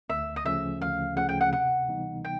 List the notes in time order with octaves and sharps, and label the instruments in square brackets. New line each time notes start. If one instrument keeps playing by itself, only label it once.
[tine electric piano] D2 [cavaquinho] E5
[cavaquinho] D#5
[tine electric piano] C#3 F3 A3 C#4 [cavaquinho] E5
[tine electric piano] D2 [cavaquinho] F5
[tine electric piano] C#3 F3 A3 C#4 [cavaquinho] F#5
[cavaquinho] G5
F#5
[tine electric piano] C3 [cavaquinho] F#5
[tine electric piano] E3 G3 B3 D#4
[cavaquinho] G5